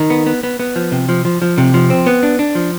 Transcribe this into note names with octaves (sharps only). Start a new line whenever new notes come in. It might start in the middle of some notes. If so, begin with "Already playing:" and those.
Already playing: D#3
B3
B3
B3
B3
F3
C3
F3
F3
F3
C3
F3
C4
B3
D4
D4
F3